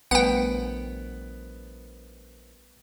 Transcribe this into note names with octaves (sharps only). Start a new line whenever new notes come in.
A#1 G3 A3 B3 F#5 G5